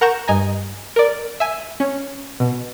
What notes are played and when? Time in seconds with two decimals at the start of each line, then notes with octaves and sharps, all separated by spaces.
0.01 A#4 F#5 A#5 C#6 G6 E7
0.28 G2 D#5 G#5 A#5
0.96 A#4 D5
1.40 E5 G#5
1.80 C#4
2.40 B2